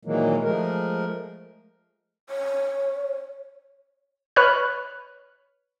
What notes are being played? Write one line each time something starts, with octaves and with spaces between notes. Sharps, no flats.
A#2 D#3 E3 F#3 G#3 A#3
F3 G#3 A3 A#4
C#5
B4 C#5 F6 F#6